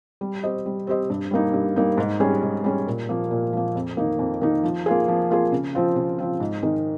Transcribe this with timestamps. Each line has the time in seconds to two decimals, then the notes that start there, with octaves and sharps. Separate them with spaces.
0.21 G3
0.43 C4 G4 C5 D#5
0.66 G3
0.87 C4 G4 C5 D#5
1.10 G2
1.31 G3 A#3 D#4
1.54 G2
1.76 G3 A#3 D#4
1.97 G#2
2.20 G3 C#4 G#4
2.42 G#2
2.64 G3 C#4 G#4
2.87 A#2
3.09 F3 A#3
3.31 A#2
3.53 F3 A#3
3.75 F2
3.97 D#3 A#3 D#4
4.19 F2
4.41 D#3 A#3 D#4
4.63 F3
4.86 A#3 F4 G#4
5.08 F3
5.31 A#3 F4 G#4
5.52 C#3
5.75 F3 C4 F4
5.96 C#3
6.18 F3 C4 F4
6.40 G#2
6.62 D#3 G#3 D#4 A#4